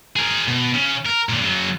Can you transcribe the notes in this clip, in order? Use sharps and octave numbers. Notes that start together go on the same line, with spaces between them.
G#4 A#4
B2
C#3
A#4
A#2 D3
C#3 F#3